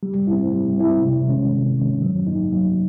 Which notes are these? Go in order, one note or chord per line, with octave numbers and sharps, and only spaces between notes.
G3
E4
C4
G3
C4 E4
C3
D#3 G#3 C#4
C3
D#3 G#3 C#4
F#3
A#3 D#4
F#3